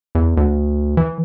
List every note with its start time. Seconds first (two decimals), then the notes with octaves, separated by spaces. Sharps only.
0.15 E2
0.37 D2
0.97 E3